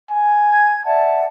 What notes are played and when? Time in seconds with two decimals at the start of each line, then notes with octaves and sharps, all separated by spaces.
0.10 G#5
0.50 G#6
0.85 D5 E5 F#5 A5